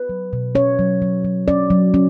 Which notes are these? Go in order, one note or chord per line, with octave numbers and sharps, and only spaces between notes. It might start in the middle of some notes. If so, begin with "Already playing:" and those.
Already playing: B4
F#3
B2
C#4 C#5
F#3
F#3
F#3
C#4 D5
F#3
C#4